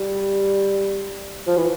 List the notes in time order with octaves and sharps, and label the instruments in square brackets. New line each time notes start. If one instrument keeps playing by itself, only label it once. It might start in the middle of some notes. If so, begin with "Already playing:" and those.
Already playing: [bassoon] G3
F3
E3